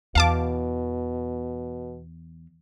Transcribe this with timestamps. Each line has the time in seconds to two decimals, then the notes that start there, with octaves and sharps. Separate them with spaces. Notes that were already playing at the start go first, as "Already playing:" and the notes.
0.15 E2 B2 F5 A5 D6